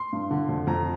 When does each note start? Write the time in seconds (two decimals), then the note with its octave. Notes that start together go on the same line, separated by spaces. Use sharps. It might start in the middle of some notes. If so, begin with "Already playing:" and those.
Already playing: C6
0.13 G2
0.31 D3
0.49 F2
0.67 F2 A#5